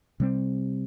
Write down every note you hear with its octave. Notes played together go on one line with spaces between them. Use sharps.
C3 G3 C4